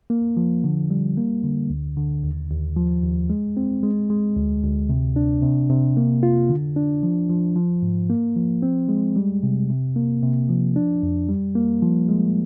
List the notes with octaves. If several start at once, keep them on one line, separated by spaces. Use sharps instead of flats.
A#3
F3
D3
G3
A#3
D3
D2
D3
D#2
D#2
F3
D#2
G#3
C4
G#3
G#3
D2
D2
C3
D4
C3
C3
A#3
F4
D3
D4
F3
F3
F3
G#2
A#3
F3
C4
G#3
G3
C3
C3
A#3
C3
F3
D4
F2
G3
A#3
F3
G#3